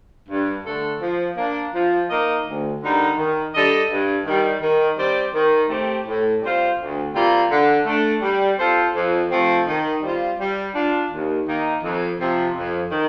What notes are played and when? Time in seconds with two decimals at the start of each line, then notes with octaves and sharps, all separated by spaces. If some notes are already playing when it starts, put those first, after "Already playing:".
0.29 G2
0.65 D3 A3 D4 A4
1.01 F3
1.37 A#3 D4
1.73 F3
2.09 A#3 D#4 A#4 D#5
2.46 D2
2.82 D3 G3 A#3 D#4
3.17 D#3
3.54 G3 D4 A4 D#5
3.89 G2
4.26 D#3 G3
4.61 D#3
4.98 G3 C4 G4 D5
5.34 D#3
5.69 A3 C4 G4
6.06 A2
6.42 G3 C4 F4 C5
6.78 D2
7.14 C3 G3 A#3 F4
7.50 D3
7.86 A3 D4
8.22 G3
8.58 C4 F4 A4 C5
8.94 F2
9.31 C3 F3 A3 C4
9.67 D#3
10.02 G3 C4 F4
10.39 G3
10.75 D4 F4
11.10 D#2
11.47 D#3 A#3 D#4
11.83 F2
12.19 C3 F3
12.55 F2
12.91 D#3